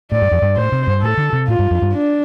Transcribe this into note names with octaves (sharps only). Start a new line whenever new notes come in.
A2 D5
G2
F2
G2
A2 C5
C3
G2
A2 A4
D3
C3
A2 F4
G2
F2
G2
D4